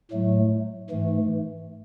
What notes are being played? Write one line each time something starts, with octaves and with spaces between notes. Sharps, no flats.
A2 F#3 A3
G#2 E3 A3